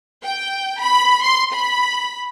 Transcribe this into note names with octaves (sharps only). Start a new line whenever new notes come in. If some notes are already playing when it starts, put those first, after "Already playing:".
G5
B5
C6
B5